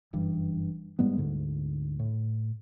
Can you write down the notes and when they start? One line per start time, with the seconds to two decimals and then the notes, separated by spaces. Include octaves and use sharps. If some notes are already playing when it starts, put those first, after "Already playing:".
0.13 F#1 G2 E3
0.99 G#2 G3 G#3 B3
1.18 D2 G#2 D3
1.99 A2